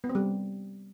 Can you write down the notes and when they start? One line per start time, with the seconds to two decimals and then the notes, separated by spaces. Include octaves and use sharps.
0.04 B3
0.09 C4
0.15 G3